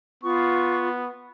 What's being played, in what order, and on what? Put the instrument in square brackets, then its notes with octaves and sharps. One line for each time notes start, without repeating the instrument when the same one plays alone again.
[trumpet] B3 [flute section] F4 C#6